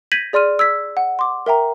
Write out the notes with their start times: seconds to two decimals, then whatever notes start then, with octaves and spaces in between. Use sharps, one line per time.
0.12 G6 G#6 A#6 B6 D#7 F#7
0.33 G#4 D5 C6 F6 D#7
0.59 E6 G#6 B6
0.97 F#5
1.19 C6 D6
1.46 A#4 E5 G5 A#5